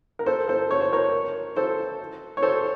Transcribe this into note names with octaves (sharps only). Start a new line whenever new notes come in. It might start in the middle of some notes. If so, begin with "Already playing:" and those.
A#4
A4 C5
A4 C5
C#5
C5
A#4 C#5
A4 C5
C#5
A4 C5